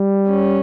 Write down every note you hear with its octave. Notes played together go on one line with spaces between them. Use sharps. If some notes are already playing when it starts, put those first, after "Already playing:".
Already playing: G3
C#4